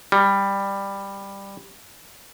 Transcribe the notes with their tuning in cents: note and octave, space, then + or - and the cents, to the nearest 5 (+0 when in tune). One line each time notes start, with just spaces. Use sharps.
G3 +10